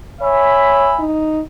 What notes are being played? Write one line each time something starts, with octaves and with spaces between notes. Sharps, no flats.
C#5 E5 G#5 B5
D#4